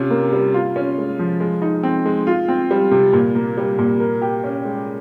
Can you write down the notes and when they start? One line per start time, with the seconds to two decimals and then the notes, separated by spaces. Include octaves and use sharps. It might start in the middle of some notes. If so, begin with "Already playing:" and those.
Already playing: C3 C#4 F4
0.11 A#3
0.33 G3
0.54 F4
0.76 C#4
0.98 G#3
1.19 F3
1.40 G#3
1.62 D#4
1.83 C4
2.05 G#3
2.27 F4
2.48 C4
2.71 G3
2.91 C3
3.13 A#2
3.35 A#3
3.58 G3
3.78 A#2
4.00 A#4
4.22 G4
4.44 C#4
4.65 G#3